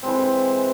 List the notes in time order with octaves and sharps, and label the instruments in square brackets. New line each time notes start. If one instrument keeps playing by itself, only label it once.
[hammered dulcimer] E3 G#3 C4